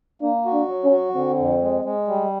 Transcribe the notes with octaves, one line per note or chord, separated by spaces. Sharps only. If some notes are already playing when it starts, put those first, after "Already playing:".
A#3 D4
F#4
D4
F#3
C#4
F#4
D3 C4
F2
G#3
G#3
G3